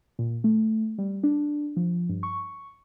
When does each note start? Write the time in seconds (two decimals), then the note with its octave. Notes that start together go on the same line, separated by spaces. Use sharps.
0.19 A#2
0.44 A3
0.98 G3
1.23 D4
1.76 F3
2.09 G2
2.23 C#6